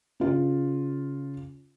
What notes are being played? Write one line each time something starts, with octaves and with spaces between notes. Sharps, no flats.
C#3 F4